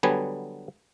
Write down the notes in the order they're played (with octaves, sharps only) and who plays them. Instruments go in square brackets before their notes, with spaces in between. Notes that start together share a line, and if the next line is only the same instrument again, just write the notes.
[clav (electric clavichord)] D3 F#3 G3 B3 G#5